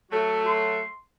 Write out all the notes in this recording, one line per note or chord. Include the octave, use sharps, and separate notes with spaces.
F#3 A3 F#4
C6